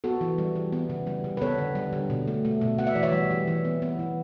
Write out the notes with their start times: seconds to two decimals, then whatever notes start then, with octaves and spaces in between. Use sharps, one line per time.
0.04 B3 F#4 A4
0.21 E3
0.38 G3
0.55 E3
0.73 B3
0.90 C#3
1.07 G3
1.24 C#3
1.37 B4
1.41 B3 A4 C#5
1.58 D3
1.75 G3
1.93 D3
2.10 B2
2.27 A3
2.45 A3
2.61 B2
2.78 B3 F#5
2.87 E5
2.95 E3 D5
3.03 C#5 E5
3.13 G3
3.31 E3
3.48 E3
3.65 B3
3.82 B3
3.99 E3